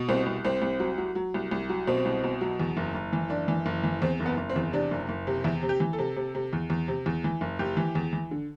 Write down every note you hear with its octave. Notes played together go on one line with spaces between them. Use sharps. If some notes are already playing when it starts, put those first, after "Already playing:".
Already playing: B2
C2 C4
C2
C2 C4
C2
F#3
F#3
F#3
C2
C2
F#3
B2 C4
C2
B2
F#3
E2
F#1
F#1
E3
F#1 D4
E3
F#1
E3
E2 C4
F#1
B3
F#1
C4
E2
C3 D4
F#1
F#1
C3
E2 E4
C3
G4
E3
A4
C3
C3
C3
E2
E2
C3
E2
E3
F#1
F#1 G4
E3
E2
E3
D3